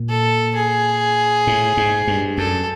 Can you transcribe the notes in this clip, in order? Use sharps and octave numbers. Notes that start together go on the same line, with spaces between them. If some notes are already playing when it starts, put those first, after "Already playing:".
Already playing: A#2
A4
G#4
A2
G#2
G2
F#2 A4